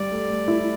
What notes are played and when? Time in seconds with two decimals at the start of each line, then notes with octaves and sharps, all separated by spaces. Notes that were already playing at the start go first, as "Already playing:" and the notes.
Already playing: G3 D5
0.11 A3
0.30 A3
0.48 E4